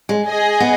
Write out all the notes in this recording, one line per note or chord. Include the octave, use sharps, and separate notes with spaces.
G#3
G#4 D#5 G#5
B3